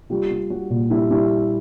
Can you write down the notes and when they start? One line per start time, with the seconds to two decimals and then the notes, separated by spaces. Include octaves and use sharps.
0.10 G3 F4
0.31 G3
0.50 G3 F#4
0.70 A#2
0.90 G3 E4
1.11 G3 E4